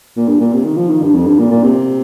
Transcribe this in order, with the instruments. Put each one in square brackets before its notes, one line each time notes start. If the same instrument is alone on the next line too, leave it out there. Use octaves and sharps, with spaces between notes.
[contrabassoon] A#2
G2
A#2
C3
D#3
F3
D#3
G2
F2
G2
A#2
A#2
C3